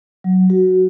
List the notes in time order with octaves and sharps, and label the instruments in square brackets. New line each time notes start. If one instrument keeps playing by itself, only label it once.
[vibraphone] F#3
F#4